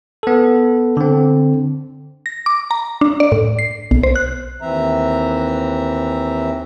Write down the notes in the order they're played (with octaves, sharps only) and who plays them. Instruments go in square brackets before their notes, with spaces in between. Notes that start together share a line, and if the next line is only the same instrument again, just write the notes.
[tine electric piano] B3 A4
D3 C4
[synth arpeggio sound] A#6
D6
A#5
D4
D5
A2
C7
B1
C5
F#6
[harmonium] D#2 E3 C4 E5 A#5